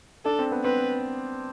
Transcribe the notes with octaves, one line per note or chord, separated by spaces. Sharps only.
D4 A4
C4
B3
C4 B4